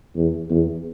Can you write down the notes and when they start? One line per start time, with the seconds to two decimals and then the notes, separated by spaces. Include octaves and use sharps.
0.16 E2
0.50 E2